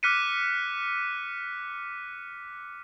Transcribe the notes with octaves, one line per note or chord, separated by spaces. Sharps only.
D6 F6 F#6 B6 C#7 D#7